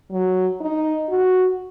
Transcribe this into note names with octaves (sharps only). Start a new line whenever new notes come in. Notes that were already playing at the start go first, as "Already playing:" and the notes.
F#3
D#4
F#4